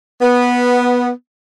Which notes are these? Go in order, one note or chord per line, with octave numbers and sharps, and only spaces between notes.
B3